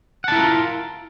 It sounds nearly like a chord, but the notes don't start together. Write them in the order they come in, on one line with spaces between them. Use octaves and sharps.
F#5 A5 E4 A#4 F4